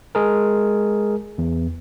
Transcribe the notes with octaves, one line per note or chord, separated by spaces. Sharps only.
G#3 G#4 A#4
E2